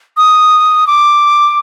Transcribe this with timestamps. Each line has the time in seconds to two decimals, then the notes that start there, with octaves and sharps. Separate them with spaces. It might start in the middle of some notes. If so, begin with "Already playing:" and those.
0.17 D#6
0.87 D6